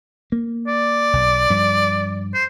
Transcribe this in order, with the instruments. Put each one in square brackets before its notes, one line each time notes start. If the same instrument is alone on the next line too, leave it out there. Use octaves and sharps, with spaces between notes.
[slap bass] A#3
[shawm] D5
[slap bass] B1
G2 F3
[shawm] C5